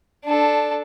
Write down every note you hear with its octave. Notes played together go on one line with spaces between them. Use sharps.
D4 A4